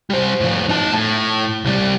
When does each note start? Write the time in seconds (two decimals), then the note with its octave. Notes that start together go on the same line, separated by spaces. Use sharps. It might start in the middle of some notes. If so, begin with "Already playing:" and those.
0.10 G3 C5
0.41 A2 F3
0.69 D#4 A5
0.93 A2
1.65 C2 G3